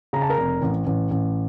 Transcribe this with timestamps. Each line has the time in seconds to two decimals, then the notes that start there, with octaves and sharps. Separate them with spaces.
0.13 C#3 A#5
0.22 A5
0.30 A#4 A#5
0.38 F1
0.62 A1
0.87 A1
1.11 A1